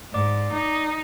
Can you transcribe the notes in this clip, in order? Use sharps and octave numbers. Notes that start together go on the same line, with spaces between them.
G#2 D5 D6
D#4